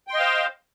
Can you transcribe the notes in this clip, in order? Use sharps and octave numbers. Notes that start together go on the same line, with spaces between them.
C5 D#5 F5 G5 C6